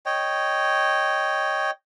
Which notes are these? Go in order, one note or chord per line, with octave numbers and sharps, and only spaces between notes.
C#5 D#5 G5